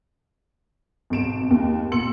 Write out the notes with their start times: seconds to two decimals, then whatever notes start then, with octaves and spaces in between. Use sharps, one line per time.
1.10 G#1 B2 D7 E7
1.51 D#2
1.91 A#2 C6 E6 C#7 F#7